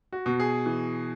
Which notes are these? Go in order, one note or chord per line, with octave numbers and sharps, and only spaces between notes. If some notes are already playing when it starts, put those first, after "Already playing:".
F#4
B2
G#4
E3